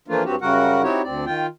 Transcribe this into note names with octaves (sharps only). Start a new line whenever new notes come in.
E3 F3 A3 A#3 D4 F4
G2 F#3 C4 F#4 G4
F#2 C#3 G3 F#4 A#4 F#5
C4 D#4 E4 F#4 G4 C#5
D2 C4 D5
D#3 F4 G5